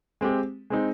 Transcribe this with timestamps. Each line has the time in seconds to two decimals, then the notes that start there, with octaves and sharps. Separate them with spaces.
0.21 G#3 C4 G4
0.70 G#3 C4 D#4